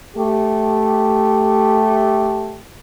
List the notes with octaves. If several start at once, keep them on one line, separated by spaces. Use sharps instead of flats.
A3 G4